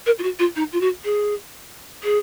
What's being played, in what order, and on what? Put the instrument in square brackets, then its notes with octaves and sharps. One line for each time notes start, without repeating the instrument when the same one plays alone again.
[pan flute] A#4
F4
F#4
F4
D#4
F4
F#4
G#4
G#4